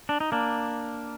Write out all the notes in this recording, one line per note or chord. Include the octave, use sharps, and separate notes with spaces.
D4
D#4
A#3 D4